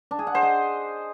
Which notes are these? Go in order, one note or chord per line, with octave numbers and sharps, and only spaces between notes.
D4
G#4
F#5
C5
D#5